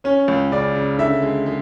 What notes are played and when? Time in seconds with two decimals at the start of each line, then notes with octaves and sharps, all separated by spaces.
0.04 C#4 C#5
0.28 C#2
0.52 C#3 D5
0.76 C#3
0.99 D3 E5
1.22 G#3
1.46 G#3